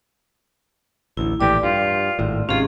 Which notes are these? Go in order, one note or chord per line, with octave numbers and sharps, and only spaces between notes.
A1 D2 E4
A#1 A2 E3 G4 D5
G2 F4
G#1 A2
G#1 G#2 C3 C#4 F4 G#4